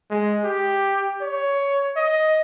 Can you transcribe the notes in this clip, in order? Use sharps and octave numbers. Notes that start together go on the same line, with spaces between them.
G#3
G4
C#5
D#5